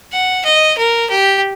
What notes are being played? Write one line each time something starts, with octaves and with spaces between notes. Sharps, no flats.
F#5
D#5
A#4
G4